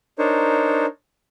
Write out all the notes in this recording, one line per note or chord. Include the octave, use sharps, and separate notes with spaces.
D4 D#4 A#4 C5 C#5